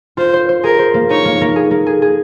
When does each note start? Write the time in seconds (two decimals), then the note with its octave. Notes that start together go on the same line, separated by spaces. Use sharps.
0.17 F4 C5
0.33 C5
0.49 C5
0.64 G#4 A#4
0.79 C5
0.94 A#3
1.10 D#4 C#5
1.25 A#3
1.41 A#3
1.56 G#4
1.71 A#3
1.86 G#4
2.02 G#4